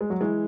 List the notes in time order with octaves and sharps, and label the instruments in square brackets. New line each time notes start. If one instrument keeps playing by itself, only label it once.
[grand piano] G#3
F#3
E3 G#3